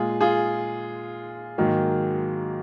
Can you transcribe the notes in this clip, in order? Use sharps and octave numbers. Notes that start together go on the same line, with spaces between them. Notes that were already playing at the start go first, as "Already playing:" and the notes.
Already playing: A#2 G#3 F4 G#4
F4 G#4
G#2 D#3 F#3 A#3